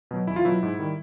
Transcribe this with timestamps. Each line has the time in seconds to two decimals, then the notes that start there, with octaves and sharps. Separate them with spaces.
0.11 B2 F#3
0.27 E2 E4
0.36 F4
0.45 B2 F#3 E4
0.63 G#2
0.79 D#3 G3